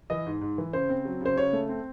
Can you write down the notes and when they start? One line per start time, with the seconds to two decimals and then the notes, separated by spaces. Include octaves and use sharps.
0.10 E3 D#5
0.26 G#2
0.41 G#2
0.58 E3
0.73 C#3 C5
0.89 C4
1.05 F#3
1.21 C#3 C5
1.36 C#3 C#5
1.53 A3
1.69 C4